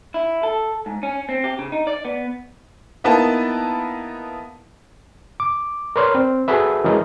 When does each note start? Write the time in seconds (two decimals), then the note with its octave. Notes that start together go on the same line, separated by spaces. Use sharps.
0.14 E4
0.43 A4
0.86 G#2
1.03 C#4
1.29 C4
1.44 G4
1.59 C#3
1.72 D#4
1.87 D5
2.05 B3
3.04 A#3 B3 D#4 E4 B4 A5
5.40 D6
5.96 A#4 B4 C#5 D5 C6 F6
6.15 C4
6.48 F#4 G#4 A4 B4 E5
6.84 E3 G#3 C#4 A#4 D#5